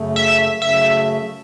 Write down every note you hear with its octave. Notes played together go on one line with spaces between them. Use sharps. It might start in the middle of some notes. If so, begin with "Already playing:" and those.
Already playing: F#2 C#3 A3
E5
F#2 C#3 A3 E5